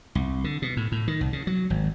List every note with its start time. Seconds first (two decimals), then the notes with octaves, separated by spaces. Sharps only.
0.15 C2
0.44 D3
0.62 B2
0.77 A2
0.92 A2
1.07 D#3
1.21 C2
1.33 C#3
1.47 F#3
1.70 G#1